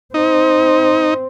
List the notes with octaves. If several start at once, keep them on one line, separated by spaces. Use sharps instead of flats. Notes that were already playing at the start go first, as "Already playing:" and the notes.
C4 D#4